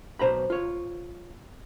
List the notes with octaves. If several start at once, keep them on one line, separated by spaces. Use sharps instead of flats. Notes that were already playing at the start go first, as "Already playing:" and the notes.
B1 C5 A#5 B5
F4 C#5